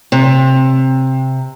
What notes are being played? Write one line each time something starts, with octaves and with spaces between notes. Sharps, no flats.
C3